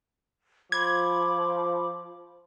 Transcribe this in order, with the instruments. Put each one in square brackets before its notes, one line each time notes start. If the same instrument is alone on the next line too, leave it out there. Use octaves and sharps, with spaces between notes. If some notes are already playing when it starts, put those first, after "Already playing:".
[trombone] F3 [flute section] B5 C6 D6 [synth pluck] G#6